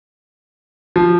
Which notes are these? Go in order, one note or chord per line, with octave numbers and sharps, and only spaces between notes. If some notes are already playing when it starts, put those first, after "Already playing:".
F3